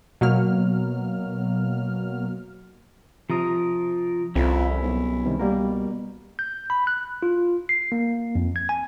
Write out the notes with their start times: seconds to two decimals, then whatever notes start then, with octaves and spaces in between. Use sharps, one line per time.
0.21 B2 F#3 A#3 F6
3.30 C3 F3 A#4 A#5 D#6
4.35 C2 F2 C#4 E4
4.82 B1
5.26 C3 D#3 G3
5.39 B2 G3 A#3 A#4
6.39 G6
6.70 B5
6.87 F#6
7.23 F4
7.69 C7
7.92 A#3
8.35 F2
8.56 G#6
8.69 G#5